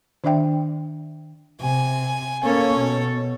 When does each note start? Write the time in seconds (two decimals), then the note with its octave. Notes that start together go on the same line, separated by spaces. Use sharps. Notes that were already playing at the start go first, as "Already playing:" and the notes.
0.24 D#3 D4 D5 E5 G5
1.61 C3 G#5
2.44 A#3 C#4 A4 C#5
2.79 B2